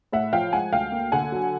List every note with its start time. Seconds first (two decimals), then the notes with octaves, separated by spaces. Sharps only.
0.13 A2 E5 F#5
0.33 F3 F5 G5
0.53 G#3 F#5 G#5
0.73 D2 F5 G5
0.92 A#3
1.12 D3 F#5 G#5
1.32 F#3